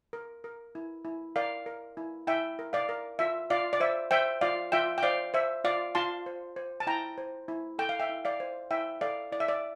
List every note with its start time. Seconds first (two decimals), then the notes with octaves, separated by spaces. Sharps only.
0.13 A#4
0.44 A#4
0.75 E4
1.05 E4
1.36 A#4 D5 F5
1.66 A#4
1.97 E4
2.27 E4 E5 G5
2.59 A#4
2.73 D5 F5
2.89 A#4
3.19 F4 E5
3.50 F4 D5 F5
3.73 D5
3.80 C5 E5
4.11 C5 E5 G5
4.41 F4 D5 F5
4.72 F4 E5 G5
4.98 G5
5.03 C5 D5 F5
5.34 C5 E5
5.64 F4 D5 F5
5.95 F4 A5 C6
6.26 C5
6.56 C5
6.80 A5
6.87 E4 G5 A#5
7.18 C5
7.48 E4
7.79 A4 G5
7.89 F5
8.00 E5 G5
8.09 E4
8.25 D5 F5
8.40 C5
8.71 E4 E5 G5
9.01 A4 D5 F5
9.32 E4 D5
9.40 E5
9.48 D5